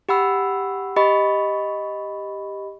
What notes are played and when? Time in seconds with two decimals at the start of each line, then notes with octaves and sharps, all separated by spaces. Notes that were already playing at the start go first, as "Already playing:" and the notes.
0.09 G4 F#5 B5 E6
0.96 G4 D#5 B5 C#6